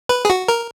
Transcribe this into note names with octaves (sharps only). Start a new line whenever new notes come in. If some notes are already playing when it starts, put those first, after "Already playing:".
B4
G#4
F#4
A#4